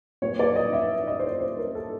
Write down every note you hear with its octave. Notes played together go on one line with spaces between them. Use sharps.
A#2 F#3 C#5
D5
D#5
E5
D#5
C5
C#5
C5
A#4
A4